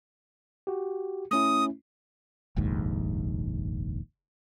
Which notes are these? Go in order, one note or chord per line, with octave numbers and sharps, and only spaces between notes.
F#4 G4
A3 C#4 E4 D#6
F1 A#1 D#2 G#2